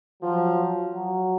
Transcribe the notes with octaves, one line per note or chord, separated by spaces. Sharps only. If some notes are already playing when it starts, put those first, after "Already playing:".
F3 F#3
F#3